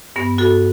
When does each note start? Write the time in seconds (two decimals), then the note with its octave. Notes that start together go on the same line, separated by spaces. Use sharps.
0.16 G2 B3
0.38 G2 F#4 A4